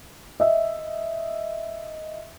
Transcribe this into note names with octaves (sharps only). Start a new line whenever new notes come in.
D#5 E5